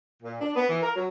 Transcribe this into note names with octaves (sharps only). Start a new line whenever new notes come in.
A#2
D4
B3
E3
A#4
F#3